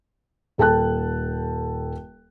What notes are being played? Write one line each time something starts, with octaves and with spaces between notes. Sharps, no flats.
D#1 A4 G5 A5 F#6